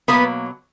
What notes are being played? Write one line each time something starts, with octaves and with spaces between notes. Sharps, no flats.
B2 F#3 A#3 B3 B4